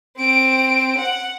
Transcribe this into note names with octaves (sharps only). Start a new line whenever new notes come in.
C4 D7
F#5